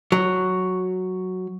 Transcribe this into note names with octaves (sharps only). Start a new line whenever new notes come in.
F#3